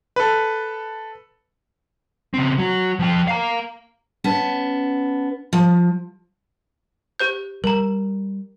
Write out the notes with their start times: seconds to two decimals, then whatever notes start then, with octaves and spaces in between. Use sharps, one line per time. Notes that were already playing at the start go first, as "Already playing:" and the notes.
0.16 A4 B4
2.34 C#3 C4
2.58 F#3 F#4
2.99 F3 G5
3.28 F5 A#5
4.24 B3 C#4 A5
5.53 F3
7.19 G4 C5 G6
7.64 G3 A#4 A#5